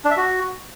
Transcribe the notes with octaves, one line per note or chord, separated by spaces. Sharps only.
D4
E5
F#4